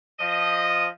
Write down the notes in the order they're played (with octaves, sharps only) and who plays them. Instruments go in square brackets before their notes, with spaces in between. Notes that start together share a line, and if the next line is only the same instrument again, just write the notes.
[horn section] F3 D#5